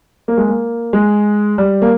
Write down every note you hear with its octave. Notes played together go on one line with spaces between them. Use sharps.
A#3
G#3
A#3
G#3
G3
A#3